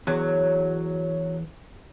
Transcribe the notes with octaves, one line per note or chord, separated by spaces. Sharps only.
E2 F#3